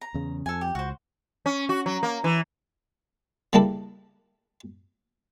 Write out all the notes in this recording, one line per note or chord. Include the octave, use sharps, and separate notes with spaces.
A#5
E2 C#3
F2 A4 G#5
G4
C#2 F#4 C5
C#4
F#4
F#3
A#3
E3
C#3 G3 A#3 D4 E4 A4